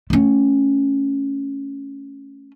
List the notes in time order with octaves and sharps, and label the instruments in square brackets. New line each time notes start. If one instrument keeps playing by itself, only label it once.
[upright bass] A3 C#4